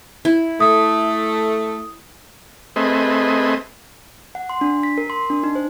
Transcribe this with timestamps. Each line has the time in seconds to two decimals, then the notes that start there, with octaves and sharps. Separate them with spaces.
0.25 E4
0.60 A3 D#6
2.76 A3 C4 G#4 B4 D#5
4.35 F#5
4.50 C6
4.61 D4
4.83 B6
4.98 A#4
5.10 C6
5.30 D4
5.43 D#4
5.55 C5